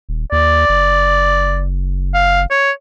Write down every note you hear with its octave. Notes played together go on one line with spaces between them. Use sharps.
D#1
D#2 D5
F#1
F5
C#5